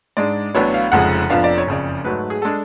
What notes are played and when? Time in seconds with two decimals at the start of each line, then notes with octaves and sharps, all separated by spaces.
0.17 G#2 G#3 D4 D5
0.55 A1 A2 F#3 B3 D4 C#5
0.74 F5
0.92 F1 F2 C#3 F3 G#3 F#5
1.30 F1 F2 F3 B3 D4 F5
1.44 D5
1.58 C#5
1.67 F#1 F2 C#3 D5
2.04 G#2 F#3 A3 B4
2.30 G#4
2.42 G#3 D4 A4